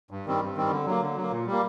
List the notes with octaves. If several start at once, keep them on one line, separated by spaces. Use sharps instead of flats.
G2
D#3 G3 C4
G2
D#3 G3 C4
D3
F#3 A#3
D3
F#3
A#3
A#2
G3 A#3